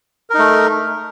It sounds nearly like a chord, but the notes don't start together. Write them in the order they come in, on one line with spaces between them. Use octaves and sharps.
A#4 D#4 A3